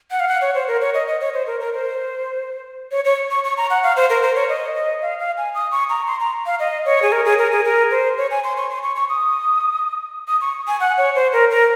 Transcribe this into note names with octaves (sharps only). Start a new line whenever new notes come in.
F#5
F5
F#5
C#5
C5
A#4
C#5
D#5
D#5
C#5
C5
A#4
A#4
C5
C#5
C#5
C#6
C#6
A#5
F#5
F5
C5
A#4
C5
C#5
D#5
D#5
F5
F5
G#5
D#6
C#6
A#5
C6
A#5
F5
D#5
C#5
G#4
A#4
G#4
A#4
G#4
A#4
C5
C#5
G#5
C6
C#6
C6
C#6
C#6
D#6
D#6
C#6
G#5
F#5
C#5
C5
A#4
A#4